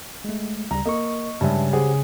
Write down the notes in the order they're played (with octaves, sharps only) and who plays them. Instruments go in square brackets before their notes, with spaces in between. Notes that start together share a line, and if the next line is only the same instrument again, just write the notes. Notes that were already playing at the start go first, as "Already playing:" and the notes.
[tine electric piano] G#3 A3
[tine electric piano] D2 C#3 G3 [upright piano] A#5
[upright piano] A#3 [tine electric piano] D#5 C#6
[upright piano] G2 [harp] C#3 G#3 [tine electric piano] E5 A5
[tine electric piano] G4 C5 F#5 [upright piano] G#4